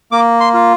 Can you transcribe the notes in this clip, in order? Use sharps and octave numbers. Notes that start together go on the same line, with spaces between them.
A#3 D6
C6
F4